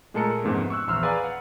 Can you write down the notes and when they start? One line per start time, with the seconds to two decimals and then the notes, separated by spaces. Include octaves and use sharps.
0.14 A#2 G#3 A3 A4 A#4 C#7
0.43 F2 G#2 C3 A3 B3 C#4
0.70 C#6 E6 F#6
0.87 A#1 E2 C6 E6 F6
1.03 G#4 B4 D5 F5 G#5 A#5
1.24 F#5